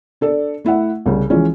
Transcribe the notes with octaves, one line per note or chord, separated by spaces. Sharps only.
D4 A4 D5
A3 E4 E5 F#5
C2 C#3
E3 F3 G#3 C#4 E4